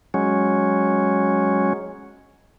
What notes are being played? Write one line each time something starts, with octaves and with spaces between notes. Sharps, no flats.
F#3 G#3 C#4